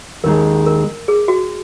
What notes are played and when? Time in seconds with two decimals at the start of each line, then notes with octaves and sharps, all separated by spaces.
0.24 D#2 D#3 G#3 A#4
0.66 A#4
1.08 G#4
1.28 F#4